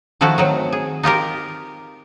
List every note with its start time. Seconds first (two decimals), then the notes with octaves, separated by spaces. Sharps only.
0.21 D#3 F3 A3 E4 F#4
0.38 D#3 F#3 C4
0.72 G#4
1.03 D#4 F4 G4 A#4